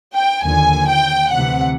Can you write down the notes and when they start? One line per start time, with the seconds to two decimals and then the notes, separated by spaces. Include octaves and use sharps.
0.15 G5
0.44 D#2 D3 F3 G#5
0.88 G5
1.32 D2 C3 E3 F#5